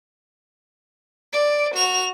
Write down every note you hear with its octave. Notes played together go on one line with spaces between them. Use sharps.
D5
F#4 F7